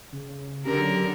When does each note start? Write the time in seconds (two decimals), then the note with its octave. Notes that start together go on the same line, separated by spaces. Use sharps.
0.12 C#3
0.65 D3 F#3 C#4 G4 A#4